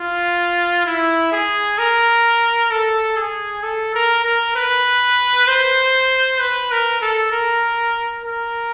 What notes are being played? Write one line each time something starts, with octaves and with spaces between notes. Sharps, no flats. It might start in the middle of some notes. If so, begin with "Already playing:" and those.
Already playing: F4
E4
G#4
A#4
A4
G#4
A4
A#4
A#4
B4
C5
B4
A#4
A4
A#4
A#4